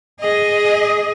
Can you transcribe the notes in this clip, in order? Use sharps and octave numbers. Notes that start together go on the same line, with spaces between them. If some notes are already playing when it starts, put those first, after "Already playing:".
G#4 D#5